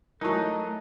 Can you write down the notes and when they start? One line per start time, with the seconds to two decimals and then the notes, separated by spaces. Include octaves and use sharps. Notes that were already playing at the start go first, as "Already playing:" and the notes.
0.21 E3 F#3 A3 D#4 A#4 A5 C#6